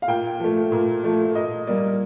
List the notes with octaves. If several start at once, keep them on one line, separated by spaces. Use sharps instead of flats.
F5
A#2 G5
F3 A3
A#2
F3 A3
A#2 D#5
G3 A#3 D5